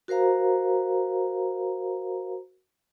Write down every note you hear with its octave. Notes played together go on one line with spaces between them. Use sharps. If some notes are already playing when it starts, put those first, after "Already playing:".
F#4 A#4 C5 F5 A#5